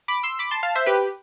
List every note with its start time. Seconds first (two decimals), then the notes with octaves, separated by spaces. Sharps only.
0.08 B5 D6
0.23 C6 E6
0.39 B5 D6
0.51 A5 C6
0.63 F5 A5
0.75 C5 E5
0.86 G4 B4